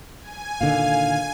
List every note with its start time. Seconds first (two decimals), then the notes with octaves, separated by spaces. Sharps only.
0.20 G#5
0.61 A#2 D3 D#3 F5